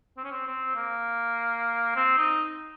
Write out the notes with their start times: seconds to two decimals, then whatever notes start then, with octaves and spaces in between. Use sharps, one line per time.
0.17 C4
0.24 C#4
0.31 C4
0.47 C4
0.76 A#3
1.96 C4
2.18 D#4